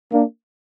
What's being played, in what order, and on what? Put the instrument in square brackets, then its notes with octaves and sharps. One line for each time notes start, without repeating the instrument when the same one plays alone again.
[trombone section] A#3 D4